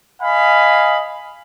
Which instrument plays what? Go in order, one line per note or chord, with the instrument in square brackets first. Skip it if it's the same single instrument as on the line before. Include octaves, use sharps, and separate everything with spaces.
[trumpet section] D#5 F5 G#5 B5